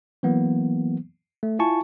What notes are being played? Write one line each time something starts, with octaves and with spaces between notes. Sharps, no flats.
E3 F#3 A#3 B3
A3
E4 F4 G#5 A5 C#6